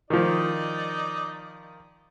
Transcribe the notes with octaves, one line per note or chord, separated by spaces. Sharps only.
D#3 F3 D#4 D5 D#5